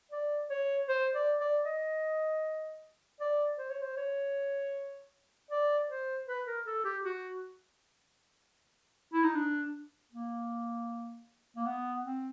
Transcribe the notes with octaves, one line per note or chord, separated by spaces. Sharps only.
D5
C#5
C5
D5
D5
D#5
D5
C5
C#5
C5
C#5
D5
C5
B4
A#4
A4
G4
F#4
E4
D#4
D4
A#3
A#3
B3
C4